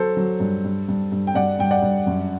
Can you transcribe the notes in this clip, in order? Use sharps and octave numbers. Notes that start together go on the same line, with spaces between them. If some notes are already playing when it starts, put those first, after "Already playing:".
Already playing: F#3 A4 C5
F#3
G2
G2
G2
G2
G5
G2 D5 F#5
G2 G5
D5 F#5
G2
F#2